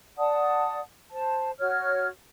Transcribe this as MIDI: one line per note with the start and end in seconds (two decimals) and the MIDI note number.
0.18 0.80 74
0.18 0.80 78
0.18 0.80 81
0.18 0.80 87
1.11 1.51 72
1.11 1.51 81
1.59 2.08 66
1.59 2.08 73
1.59 2.08 89